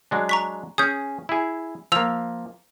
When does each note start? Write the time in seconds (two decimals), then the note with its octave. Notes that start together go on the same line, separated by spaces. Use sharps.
0.11 F#3 G#3 D4
0.29 A#5 C#6 B6
0.78 C#4 G#4 D#6 G6
1.29 E4 G#4
1.92 F3 A#3 E6 F7